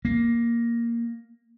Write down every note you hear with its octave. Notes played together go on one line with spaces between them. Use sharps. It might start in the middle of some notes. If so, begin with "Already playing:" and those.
A#3